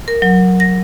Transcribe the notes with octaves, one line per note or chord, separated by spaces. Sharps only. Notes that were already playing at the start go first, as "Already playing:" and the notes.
A#4
F#3
A#6